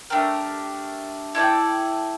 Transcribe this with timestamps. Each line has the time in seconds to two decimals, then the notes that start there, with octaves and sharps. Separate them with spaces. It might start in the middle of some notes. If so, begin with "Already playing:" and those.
0.10 A3 D4 G4 A#4
1.35 E4 A4 D5 G5